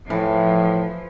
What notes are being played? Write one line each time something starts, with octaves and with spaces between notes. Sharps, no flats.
A2 E3 F3